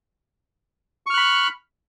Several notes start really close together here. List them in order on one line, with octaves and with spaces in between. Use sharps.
C#6 F6 F#6 B5